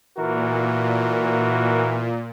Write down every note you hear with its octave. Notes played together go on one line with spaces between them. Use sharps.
A#2 E3 F#4 A#4